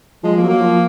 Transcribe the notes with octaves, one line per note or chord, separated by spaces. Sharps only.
F3 G#3
A#3
F#3
A#3
F3